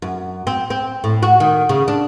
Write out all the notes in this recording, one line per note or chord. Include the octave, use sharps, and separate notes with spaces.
F#2
C4
C4
A2
F#4
D#3
C#3
D4